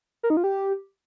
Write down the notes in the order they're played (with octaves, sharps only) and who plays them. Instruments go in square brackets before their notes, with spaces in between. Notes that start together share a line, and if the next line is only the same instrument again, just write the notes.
[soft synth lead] A#4
D#4
F4
G4